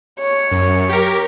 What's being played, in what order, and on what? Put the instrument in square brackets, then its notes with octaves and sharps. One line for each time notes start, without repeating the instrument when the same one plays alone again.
[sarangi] C#5
[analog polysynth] F#2
G4 A#4